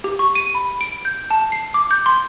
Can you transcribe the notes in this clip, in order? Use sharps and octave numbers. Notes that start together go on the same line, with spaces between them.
G4
C#6
D#7
B5
D7
G6
A5
C7
D6
G6
C6